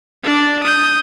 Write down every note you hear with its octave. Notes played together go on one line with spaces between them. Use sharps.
D4 D5
D#6 G6